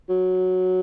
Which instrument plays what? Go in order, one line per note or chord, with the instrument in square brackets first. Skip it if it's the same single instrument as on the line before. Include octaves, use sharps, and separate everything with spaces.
[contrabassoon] F#3